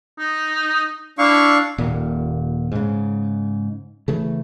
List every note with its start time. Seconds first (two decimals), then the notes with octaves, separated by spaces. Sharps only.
0.19 D#4
1.18 D4 E4 F5 C#6
1.78 D#1 A#2
2.72 G#2 C#3
4.08 C#3 E3 A3